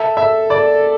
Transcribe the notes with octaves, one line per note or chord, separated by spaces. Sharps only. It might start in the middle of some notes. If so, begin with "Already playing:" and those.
Already playing: A4 E5
E5
D5